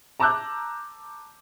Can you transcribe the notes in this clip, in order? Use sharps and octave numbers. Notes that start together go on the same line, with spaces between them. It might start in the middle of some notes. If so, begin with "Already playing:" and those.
A5 A#5 D6 E6 F#6 G6